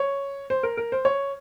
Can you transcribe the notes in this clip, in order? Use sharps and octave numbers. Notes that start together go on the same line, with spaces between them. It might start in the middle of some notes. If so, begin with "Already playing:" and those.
Already playing: C#5
C5
A#4
A#4
C5
C#5